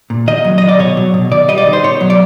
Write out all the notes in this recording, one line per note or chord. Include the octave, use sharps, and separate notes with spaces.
A#2
D#3 D#5
F#3
D#3 D#5
D5
B2 C#5
F#3
B2
D#3 D5
G3 D#5
D5
D#3
C5
B2 C#5
F#3
D5